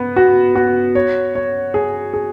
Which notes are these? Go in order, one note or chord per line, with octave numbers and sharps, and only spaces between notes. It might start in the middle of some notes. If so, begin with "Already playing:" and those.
Already playing: B3
F#4
F#4
C#5
C#5
G#4
G#4